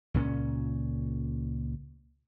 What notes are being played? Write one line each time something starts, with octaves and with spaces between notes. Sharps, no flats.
C#2 A#2 C4 C#4